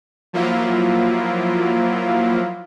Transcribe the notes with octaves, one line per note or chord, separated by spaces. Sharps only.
F3 F#3 A#3 E4 F4